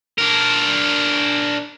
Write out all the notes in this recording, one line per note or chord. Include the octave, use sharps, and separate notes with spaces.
D4 A#4